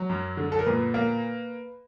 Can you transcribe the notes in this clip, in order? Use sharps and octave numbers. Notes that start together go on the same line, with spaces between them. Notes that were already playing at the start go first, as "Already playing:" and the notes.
Already playing: F#3
F#2
D3
A4
A#4
A#2 B4
A#3